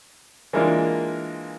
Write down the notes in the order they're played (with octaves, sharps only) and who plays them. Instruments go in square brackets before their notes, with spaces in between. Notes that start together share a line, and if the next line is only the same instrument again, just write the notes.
[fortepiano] E3 G#3 A#3 D4 F4